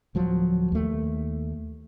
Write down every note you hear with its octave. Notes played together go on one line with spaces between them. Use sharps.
D1 F3 F#3
D#2 A3